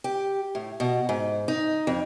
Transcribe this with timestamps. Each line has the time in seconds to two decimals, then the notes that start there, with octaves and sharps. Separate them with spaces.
0.04 G4
0.55 A2
0.80 B2
1.09 G#2
1.48 D#4
1.87 F2